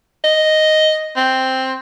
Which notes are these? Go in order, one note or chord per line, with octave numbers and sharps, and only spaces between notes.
D#5
C4